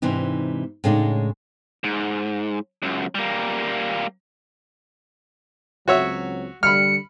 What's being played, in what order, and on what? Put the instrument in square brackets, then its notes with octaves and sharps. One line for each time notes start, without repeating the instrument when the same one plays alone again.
[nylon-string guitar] G#2 C3 E3 D4 D#4
A2 C#3 G#3 D4 D#4
[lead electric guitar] G#2
C#2 F#2
G3 A#3
[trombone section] C#2 F#3 C4 [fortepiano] F#4 C#5 E5
[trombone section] D3 G3 [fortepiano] B5 F6 [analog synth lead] C#7